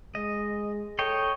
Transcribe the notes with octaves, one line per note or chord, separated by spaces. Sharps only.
G#3 D#5
A4 C#5 D#5 G5